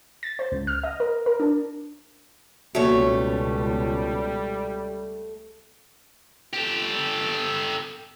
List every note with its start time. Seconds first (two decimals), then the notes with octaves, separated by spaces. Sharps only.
0.23 A6
0.39 C5
0.52 C#2
0.67 F6
0.84 D#5
1.00 A#4
1.26 A#4
1.40 D4
2.75 C#2 B2 G3 A3 A#3 F#4 C#5
6.54 G4 A4